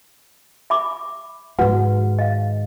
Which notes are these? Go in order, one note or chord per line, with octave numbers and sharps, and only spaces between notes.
E5 B5 D6
G#2 D#3 F#4 B4 F#5
D#5 F5